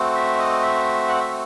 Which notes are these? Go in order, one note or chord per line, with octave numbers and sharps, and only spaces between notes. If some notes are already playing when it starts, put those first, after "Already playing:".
Already playing: A3 C4 F#4
E5
D#5
E5
F#5
E5